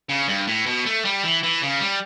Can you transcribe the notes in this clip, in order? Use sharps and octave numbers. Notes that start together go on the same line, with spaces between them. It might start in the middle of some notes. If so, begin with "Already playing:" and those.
C#3
G2
A2
B2
A3
G3
E3
E3
C#3
G3